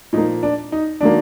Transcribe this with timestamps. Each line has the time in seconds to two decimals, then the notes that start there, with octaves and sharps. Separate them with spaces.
0.13 A#2 F3 A#3 D#4
0.43 D4
0.72 D#4
1.01 D#3 F#3 A#3 D4